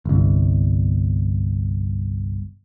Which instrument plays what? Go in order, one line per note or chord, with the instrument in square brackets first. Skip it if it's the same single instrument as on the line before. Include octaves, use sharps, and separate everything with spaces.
[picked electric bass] G1 C2